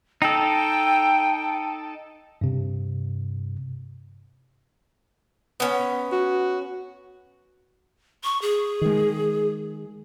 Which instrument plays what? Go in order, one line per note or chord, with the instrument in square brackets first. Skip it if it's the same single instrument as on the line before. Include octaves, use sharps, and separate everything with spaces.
[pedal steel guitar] D#4 A4 [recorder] G5
[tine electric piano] G2 C3
[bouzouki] B3 C#4
[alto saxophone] F#4
[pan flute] C#6
G#4
[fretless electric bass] D#3 G#3